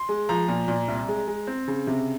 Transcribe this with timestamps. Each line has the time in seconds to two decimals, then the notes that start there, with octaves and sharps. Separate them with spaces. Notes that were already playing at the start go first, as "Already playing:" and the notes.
Already playing: C6
0.09 G#3
0.29 F3 A#5
0.48 A#2
0.68 A#2
0.88 C2
1.08 G#3
1.27 G#3
1.47 C4
1.68 C#3
1.87 C3